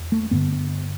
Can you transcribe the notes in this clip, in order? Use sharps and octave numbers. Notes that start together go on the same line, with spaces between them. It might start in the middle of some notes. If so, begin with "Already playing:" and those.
Already playing: E2
A3
G2 D3 B3